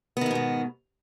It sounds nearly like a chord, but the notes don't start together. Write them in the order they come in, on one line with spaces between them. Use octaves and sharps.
B3 D#3 F2 B2 G#2